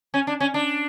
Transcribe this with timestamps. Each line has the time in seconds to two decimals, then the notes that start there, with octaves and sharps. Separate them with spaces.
0.14 C#4
0.27 D4
0.40 C#4
0.54 D4